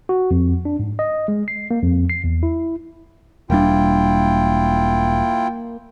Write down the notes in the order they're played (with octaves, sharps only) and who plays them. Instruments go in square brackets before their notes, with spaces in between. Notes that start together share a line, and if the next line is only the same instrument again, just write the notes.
[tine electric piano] F#4
F2
D4
G#2
D#5
G#3
C7
A#3
F2
C7
E2
E4
[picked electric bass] E1 G3 D4 [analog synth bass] A#3 [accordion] E4 F4 G5